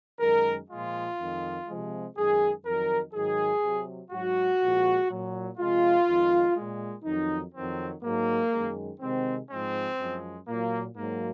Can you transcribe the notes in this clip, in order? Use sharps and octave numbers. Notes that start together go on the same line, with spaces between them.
F#2 D#3 G#3 A#4
A#2 F3 G#3 F4
F2 D#3 G#3
C3 F3 G#3
F#2 D#3 G#3 G#4
F2 D#3 F#3 A#4
G#2 D#3 F#3 G#4
C3 F#3
G#2 F#3 F#4
A#2 F3 G#3
A#2 F#3
C3 F3 G#3 F4
F2 D#3 G#3
A#2 G#3
F2 D#3 F#3 D#4
F2 D#3 F#3 C4
G#2 F#3 A#3
F#2 D#3 G#3
C3 D#3 G#3 C4
G#2 F3 G#3 C4
F#2 F3 G#3
A#2 F#3 A#3
G#2 F#3 A#3